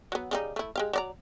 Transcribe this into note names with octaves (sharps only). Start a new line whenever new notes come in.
F#3 B3
C#3 G3 D#4
A3 E4
G#3 G4 F5
F#3 D5 A#5